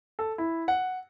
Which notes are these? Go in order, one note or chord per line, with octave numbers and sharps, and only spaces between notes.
A4
E4
F#5